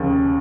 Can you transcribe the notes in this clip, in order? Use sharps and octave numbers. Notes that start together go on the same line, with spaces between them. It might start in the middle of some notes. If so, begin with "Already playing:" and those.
Already playing: F1 D#2 C#3